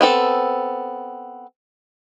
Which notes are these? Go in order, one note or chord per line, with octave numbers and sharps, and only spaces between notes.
B3 C4 A4